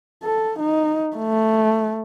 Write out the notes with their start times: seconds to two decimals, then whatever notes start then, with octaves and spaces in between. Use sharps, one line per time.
0.24 A4
0.59 D#4
1.17 A3